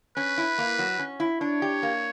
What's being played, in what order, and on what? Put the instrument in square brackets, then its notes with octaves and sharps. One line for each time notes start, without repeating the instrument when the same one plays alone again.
[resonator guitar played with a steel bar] C#4 [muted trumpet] B4
[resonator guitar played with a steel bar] E4
A#3
F#3
C#4
E4
[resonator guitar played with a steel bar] D4 [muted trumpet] C#5
[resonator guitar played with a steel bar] G4
A#3